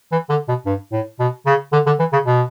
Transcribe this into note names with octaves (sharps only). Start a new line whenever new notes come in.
E3
D3
B2
G2
A2
B2
C#3
D3
D3
E3
C#3
B2